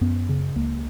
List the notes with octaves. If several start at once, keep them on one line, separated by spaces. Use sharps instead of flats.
F#2 B3
C#3
C#2 A#3